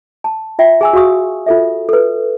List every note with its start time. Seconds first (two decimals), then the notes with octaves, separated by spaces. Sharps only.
0.24 A5
0.59 F4 E5 G5
0.81 G#4 G#5 E6
0.93 F#4 G#4 F5 C#6 D#6
1.46 F4 A4 E5
1.89 A4 B4